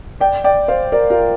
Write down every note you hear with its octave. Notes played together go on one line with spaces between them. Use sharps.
D5 G5
D5 G5
C5 F5
A#4 D5
F4 A#4